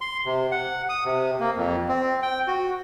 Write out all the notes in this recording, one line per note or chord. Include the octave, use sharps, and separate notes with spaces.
C6
C3
F#5
D#6
C3
A#3
F2
C4
G5
F#4